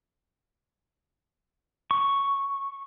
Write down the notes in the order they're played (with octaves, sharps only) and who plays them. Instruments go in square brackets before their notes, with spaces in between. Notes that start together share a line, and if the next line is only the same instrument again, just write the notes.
[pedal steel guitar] C#6